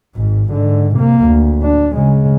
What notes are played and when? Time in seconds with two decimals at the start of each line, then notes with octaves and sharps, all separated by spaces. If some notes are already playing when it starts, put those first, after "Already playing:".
0.16 G#1 G#2
0.51 G#2 D3
0.95 C3 A#3
1.24 D2
1.63 D4
1.94 C#3 G#3